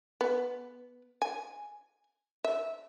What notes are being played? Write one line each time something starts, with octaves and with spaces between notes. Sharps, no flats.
B3
G#5
E5